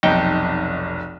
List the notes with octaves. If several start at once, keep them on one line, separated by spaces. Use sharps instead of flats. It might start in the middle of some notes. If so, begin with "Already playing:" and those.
F1 B1 D#4 G5